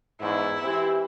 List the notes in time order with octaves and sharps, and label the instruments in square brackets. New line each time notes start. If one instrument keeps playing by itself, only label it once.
[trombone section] E2 G#2 [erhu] E4
[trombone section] E3 C4 [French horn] G4